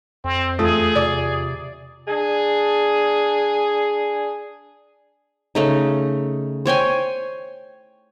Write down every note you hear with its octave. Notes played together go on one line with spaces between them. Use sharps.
F2 C4
E2 A3 F4 G#4 D#6
C3 D5
D4 G#4
C#3 A3 D#4
C5 C#5 G5 G#5